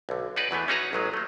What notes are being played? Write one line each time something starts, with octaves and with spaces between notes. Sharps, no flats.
B1 D3
D#4 F#4 G#4 B4 D5
E2 E3 A3 B3
C#4 D#4 F#4 G#4 B4 A#5
A1 F#3 G#3
A3 A#3